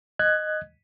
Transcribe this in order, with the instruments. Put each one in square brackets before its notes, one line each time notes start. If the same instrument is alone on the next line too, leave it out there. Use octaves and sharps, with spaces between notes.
[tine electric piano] D#5 F#6 G#6